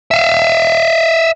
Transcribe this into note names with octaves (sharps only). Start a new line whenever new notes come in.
E5 F5